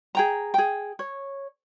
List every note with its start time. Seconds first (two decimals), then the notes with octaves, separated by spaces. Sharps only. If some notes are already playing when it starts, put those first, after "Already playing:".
0.15 G#4 G5 A#5
0.54 G#4 G5
0.99 C#5